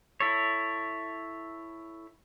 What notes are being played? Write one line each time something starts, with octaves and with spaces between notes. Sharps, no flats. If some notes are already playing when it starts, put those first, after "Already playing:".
E4 A4 C#5